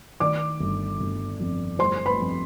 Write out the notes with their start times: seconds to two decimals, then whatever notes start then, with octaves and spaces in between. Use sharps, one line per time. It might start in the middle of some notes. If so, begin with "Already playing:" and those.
0.20 D#3 D5 D6
0.60 G1
1.00 G1
1.40 F2
1.79 G3 C5 C6
2.06 B4 B5
2.20 F2